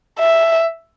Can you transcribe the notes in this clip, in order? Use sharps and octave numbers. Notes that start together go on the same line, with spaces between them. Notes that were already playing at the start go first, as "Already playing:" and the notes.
E5